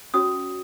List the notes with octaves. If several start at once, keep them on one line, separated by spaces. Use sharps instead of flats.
C#4 F#4 C#5 D#6